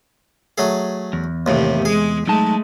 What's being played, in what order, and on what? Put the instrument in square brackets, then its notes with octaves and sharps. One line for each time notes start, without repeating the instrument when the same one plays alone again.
[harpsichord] F#3 A3 G#4
[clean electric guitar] E2
[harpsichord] D#2 A2 [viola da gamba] C3
[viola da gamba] G#3 [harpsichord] G#4
[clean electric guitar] F#3 D#4 A5 [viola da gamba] G#3 A3